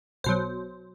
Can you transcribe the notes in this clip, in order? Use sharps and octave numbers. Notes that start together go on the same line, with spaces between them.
B1 B2 F#3 C5